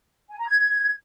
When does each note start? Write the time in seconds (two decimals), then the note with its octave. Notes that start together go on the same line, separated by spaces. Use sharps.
0.30 G#5
0.39 A#5
0.47 G#6